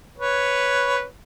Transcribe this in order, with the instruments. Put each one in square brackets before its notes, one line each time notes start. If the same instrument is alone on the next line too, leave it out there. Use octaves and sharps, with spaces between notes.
[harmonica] B4 C#5